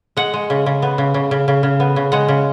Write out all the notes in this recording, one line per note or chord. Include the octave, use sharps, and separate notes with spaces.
G#3 F#5
G#3
C#3
C#3
B3
C#3
C#3
C#3
C#3
C#3
B3
C#3
G#3 F#5
C#3